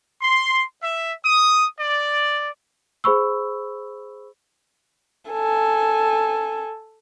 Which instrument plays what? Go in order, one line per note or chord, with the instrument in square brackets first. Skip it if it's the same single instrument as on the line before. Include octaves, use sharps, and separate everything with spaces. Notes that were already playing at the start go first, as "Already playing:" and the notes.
[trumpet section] C6
E5
D#6
D5
[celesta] G#4 C5 B5 C#6 E6
[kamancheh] A4 G#5